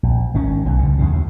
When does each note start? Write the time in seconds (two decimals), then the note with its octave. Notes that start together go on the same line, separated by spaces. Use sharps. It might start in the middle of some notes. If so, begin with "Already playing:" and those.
0.03 A#1
0.34 G#1 D#3 C#4
0.66 B1 B2
0.79 C#2 D3
0.98 E2 G2 C#3
1.13 D2